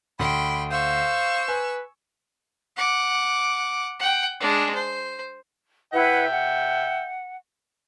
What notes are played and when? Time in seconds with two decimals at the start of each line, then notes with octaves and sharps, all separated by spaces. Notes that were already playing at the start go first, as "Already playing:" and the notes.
0.19 D2 G5 B5 C6
0.72 C5 F5 C#6 E6
1.48 B4 G#5
2.77 F#5 D6
3.99 F#5 G5
4.40 G#3 D4
4.75 C5
5.93 E4 B4 E5 F#5 G5
6.33 F#5